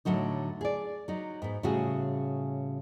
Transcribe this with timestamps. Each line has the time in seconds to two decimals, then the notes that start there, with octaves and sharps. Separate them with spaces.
0.05 A2 D3 F#3 D#4
0.61 G#4 D5
1.08 F#3 D#4
1.42 G#2 B3
1.63 A2 C#3 G3 F#4 G#4